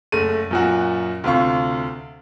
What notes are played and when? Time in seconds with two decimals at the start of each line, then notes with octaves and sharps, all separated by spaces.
0.12 F#1 A3 D#7
0.51 F#2 A#2 F#4
1.24 D2 C3 F4 C#6